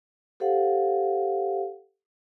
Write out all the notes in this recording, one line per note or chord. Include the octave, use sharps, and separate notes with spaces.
G4 A4 C5 F5 F#5